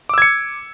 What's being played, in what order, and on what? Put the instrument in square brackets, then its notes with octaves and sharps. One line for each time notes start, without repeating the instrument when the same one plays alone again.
[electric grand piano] D6
E6
G#6
C#7